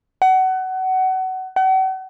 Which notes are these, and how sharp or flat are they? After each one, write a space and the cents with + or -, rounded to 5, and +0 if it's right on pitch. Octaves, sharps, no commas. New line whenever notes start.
F#5 +25
F#5 +40